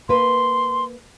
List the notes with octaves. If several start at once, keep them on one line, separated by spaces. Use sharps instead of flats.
A#3 B4 C6